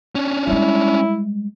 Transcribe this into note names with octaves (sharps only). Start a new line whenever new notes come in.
C#4 D4
G3 G#3 E4